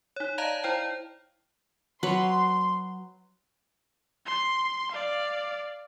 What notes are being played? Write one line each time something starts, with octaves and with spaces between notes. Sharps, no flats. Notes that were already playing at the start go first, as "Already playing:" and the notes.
D#4 C#5
D5 D#5 F5 A5 A#5
E4 C5 G5
F#3 B4 C6
C6
D5 F5